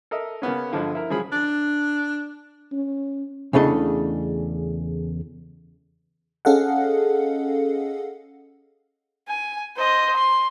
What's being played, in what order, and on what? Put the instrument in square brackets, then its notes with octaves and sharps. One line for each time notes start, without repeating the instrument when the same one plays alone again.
[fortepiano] A4 A#4 D#5 E5
C#3 A#3 B3 C#4
G2 D3 F3 G#3
E4 A#4
C#3 F3 F#3 G#4 B5
[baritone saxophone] D4
[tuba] C#4
[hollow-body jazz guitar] E2 C#3 A3 D4 D#5
[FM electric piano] C#4 G#4 A4 D#5 F5 F#5
[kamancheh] G#5
C5 D#5
C6